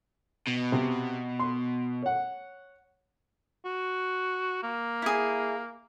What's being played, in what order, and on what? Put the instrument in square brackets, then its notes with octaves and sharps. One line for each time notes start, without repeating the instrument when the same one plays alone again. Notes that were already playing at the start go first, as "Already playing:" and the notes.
[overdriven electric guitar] B2
[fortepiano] C3
C6
C#5 F#5
[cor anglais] F#4
A#3
[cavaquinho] E4 G#4